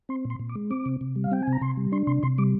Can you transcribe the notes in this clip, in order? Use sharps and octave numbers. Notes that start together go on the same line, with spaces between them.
C4 C6
A#2
C6
A#2
D6
G#3
C4 D6
C3
C3
G3
F5
C4 G5
G#5
C3
A#5
C3 C6
G3
D4 C6
C3 C6
C3 C6
G3 D6